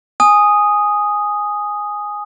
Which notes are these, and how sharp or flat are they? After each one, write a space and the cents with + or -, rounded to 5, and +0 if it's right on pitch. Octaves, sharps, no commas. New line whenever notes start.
G#5 +0 D#6 +0